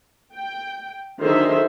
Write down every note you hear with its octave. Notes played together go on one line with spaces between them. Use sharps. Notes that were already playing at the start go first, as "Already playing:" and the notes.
G5
D3 D#3 F#3 G#4 C5 E5